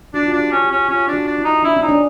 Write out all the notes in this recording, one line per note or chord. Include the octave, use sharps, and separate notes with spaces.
D4 F#4
F4
D4 F#4
G4
C#4
G4
C#4
C#4 F4
D4
F#4
D4
E4
D#4
D4 E4
C#4
D#4
D4